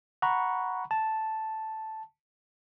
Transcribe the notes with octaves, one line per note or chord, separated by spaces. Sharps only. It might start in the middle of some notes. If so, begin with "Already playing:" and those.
F#5 A#5 B5 C#6
A5